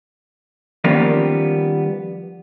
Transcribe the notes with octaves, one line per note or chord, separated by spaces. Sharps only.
D#3 F3 G3 A#3 B3 C#4